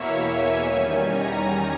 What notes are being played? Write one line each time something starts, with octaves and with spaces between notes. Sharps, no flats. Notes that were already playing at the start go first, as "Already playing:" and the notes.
Already playing: E2 B2 A#3 E4 C#5 E5
G#5
E2 D#3 G3 C#4
A#5